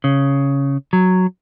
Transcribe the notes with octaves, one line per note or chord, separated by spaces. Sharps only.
C#3
F#3